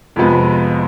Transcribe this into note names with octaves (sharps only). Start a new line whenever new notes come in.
F2 C3 F3 G#3 B3